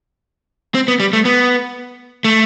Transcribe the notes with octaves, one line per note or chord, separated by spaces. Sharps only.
C4
B3
G3
A3
B3
A3